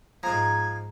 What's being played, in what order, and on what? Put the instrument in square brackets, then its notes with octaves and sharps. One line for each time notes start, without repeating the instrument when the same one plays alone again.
[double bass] G#2 [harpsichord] F3 G#3 [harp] A#5 [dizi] G#6